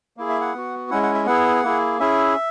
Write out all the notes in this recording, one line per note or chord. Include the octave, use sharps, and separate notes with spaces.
A#3 E4 G#4
E5
F#5
B3 F#4
G#3 C#4 E4 F#5
F#5
E5
B3 E4 G#4 F#5
A#3 E4 G#4
C#4 E4 G#4 E5